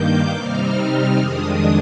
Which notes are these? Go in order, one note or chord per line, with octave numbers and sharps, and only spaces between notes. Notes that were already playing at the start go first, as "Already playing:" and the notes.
Already playing: G2 D#3 A#3 D6 G6
C3 G3 C4 D#4 F6
F2 D#3 G#3 D4 D#6